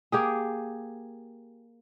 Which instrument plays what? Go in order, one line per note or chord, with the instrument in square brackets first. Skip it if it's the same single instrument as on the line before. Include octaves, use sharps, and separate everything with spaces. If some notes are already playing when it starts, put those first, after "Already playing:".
[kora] A#3 G4 G#4